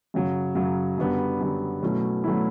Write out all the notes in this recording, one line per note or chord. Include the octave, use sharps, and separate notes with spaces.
F#2 C#3 F#3
F#2 C#3 F#3
F#2 D3 G3 B3
F#2 D3 G3 B3
B2 F#3 A3 C#4 E4
B2 F#3 A3 C#4 E4